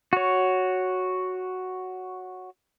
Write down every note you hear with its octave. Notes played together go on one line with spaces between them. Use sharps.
F#4 C#5